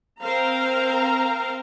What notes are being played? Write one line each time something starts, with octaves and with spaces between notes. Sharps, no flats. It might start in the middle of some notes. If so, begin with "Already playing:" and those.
C4 A#4 C5 F5 A#5